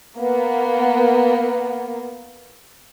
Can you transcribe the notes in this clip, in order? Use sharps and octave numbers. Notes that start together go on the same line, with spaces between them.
A#3 B3